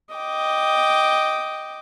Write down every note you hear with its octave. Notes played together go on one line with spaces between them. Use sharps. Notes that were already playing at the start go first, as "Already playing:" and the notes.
D#5 G5 D6